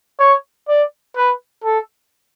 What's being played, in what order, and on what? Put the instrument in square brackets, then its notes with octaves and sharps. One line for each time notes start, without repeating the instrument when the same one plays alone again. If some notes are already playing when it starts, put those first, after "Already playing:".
[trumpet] C#5
D5
B4
A4